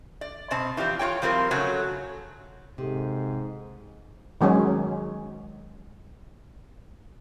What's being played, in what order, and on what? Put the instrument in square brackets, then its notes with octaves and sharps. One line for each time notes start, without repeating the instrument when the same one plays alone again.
[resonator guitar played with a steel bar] D5
B2 C4 A5
E3 F3 G3 C4
F4 F#4 C#5 G5
F3 G3 C4 F4 A#4
C#3 F#3 A3
[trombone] G#2 [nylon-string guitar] C3 [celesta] G4 A4
[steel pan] D#3 F#3 G#3 C#4